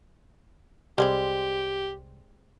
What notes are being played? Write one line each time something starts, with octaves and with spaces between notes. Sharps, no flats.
C2 G3 G#3 C4 G4